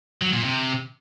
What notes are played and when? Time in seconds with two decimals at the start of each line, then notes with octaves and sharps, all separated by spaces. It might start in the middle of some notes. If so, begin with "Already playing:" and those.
0.22 F#3
0.33 A#2
0.44 C3